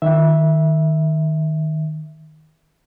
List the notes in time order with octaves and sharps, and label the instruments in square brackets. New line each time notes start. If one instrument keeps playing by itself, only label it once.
[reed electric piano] D#3 E5